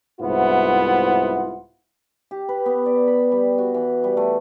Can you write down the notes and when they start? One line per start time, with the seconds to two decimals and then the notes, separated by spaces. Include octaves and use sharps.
0.21 C2 G#2 B3 E4 F4 F#5
2.31 G4
2.49 B4
2.66 B3
2.86 D5
3.07 B5
3.32 G3
3.58 F#4
3.74 E3
4.04 G3
4.17 A3